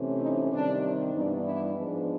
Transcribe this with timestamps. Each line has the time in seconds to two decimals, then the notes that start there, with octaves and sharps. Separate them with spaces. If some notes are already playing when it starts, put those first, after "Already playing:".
Already playing: C3 E3 A3 C#4
0.21 D#4
0.51 C3 D#3 G3 D4
1.12 G2 E3 G3 B3 D4 D#4
1.43 D4 E4
1.74 G#2 F3 G#3 B3 D4